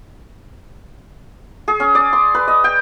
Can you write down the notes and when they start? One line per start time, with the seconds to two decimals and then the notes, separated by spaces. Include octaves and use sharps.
1.68 G#4
1.80 C#4
1.95 D5
2.13 C6
2.34 B4
2.48 D#5
2.64 G5